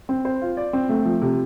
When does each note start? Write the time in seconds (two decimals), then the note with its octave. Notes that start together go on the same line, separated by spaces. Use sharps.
0.09 C4
0.25 C5
0.42 F4
0.57 D5
0.73 C4
0.89 A3
1.05 F3
1.22 C3